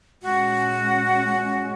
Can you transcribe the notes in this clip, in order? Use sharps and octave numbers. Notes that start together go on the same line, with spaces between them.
A#2 G#3 C#4 F#4